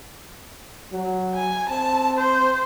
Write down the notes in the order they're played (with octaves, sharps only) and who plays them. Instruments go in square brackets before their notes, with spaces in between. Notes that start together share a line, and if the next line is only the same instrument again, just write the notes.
[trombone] F#3
[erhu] G#5
[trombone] C4 [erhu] A5
[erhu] C5